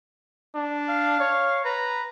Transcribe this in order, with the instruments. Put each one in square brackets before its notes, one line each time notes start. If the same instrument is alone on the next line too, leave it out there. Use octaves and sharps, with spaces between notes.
[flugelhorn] D4
[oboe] F5
[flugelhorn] C#5
[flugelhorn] B4 [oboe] A#5